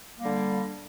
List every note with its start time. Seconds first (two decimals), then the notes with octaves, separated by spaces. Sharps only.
0.19 A#3
0.22 G3
0.25 D3